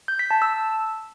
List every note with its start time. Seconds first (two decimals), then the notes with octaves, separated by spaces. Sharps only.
0.08 G6
0.19 B6
0.31 A5
0.42 E6